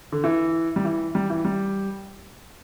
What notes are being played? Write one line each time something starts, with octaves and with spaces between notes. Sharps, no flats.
D3
E3
G3
E3
G3
E3
G3